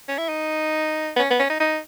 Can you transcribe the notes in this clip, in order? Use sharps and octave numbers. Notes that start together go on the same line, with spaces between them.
C#4
E4
D#4
B3
C#4
B3
C#4
D#4
D#4